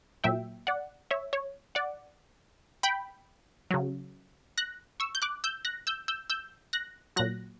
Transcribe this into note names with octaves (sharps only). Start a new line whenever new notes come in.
A#2 F#3 E5 G5
D5 F#5
C#5 E5
C#5
D5 F#5
G5 B5
C#3 F#3
F#6 A#6
C#6 E6
G6
D6 F#6
E6 G6
F#6 A#6
E6 G6
E6 G6
E6 G6
F#6 A#6
A#2 F#3 F#6 A#6